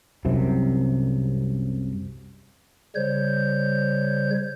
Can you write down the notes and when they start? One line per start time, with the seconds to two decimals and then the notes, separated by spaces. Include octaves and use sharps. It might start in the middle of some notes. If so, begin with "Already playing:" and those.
0.25 C2 F#2 C3
2.95 C#3 G3 C5 C#5 G6